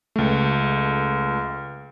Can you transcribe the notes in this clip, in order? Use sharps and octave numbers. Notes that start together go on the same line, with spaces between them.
C#2 A3